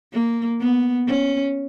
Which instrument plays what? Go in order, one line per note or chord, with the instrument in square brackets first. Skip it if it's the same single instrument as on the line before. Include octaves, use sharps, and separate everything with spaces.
[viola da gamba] A#3
B3
C#4